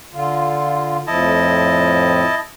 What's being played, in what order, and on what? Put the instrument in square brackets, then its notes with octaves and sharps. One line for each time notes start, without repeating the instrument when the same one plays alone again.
[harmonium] D3 F4
[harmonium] F2 A2 F3 [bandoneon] E4 D#5 A5